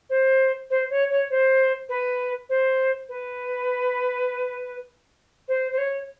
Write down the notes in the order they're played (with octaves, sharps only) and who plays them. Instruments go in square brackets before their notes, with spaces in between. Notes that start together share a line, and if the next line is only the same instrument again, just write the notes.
[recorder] C5
C5
C#5
C#5
C5
B4
C5
B4
C5
C5
C#5